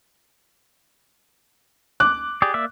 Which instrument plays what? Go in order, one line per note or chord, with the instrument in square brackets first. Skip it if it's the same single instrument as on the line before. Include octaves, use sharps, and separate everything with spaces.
[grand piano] D6 F#6
[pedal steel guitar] G4 G#4 D5
A#3 D5 E5